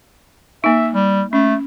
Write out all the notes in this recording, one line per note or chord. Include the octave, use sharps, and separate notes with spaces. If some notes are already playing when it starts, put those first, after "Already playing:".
A#3 D#4 E5
G3
A3 C#4